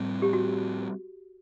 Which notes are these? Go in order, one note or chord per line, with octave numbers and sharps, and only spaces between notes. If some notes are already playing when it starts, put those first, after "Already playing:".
Already playing: A2 G3 C4
G4
F#4